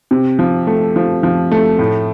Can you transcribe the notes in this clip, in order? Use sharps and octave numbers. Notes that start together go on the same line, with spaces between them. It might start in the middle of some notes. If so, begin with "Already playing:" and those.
C3
F3
A3
F3
F3
A3
A2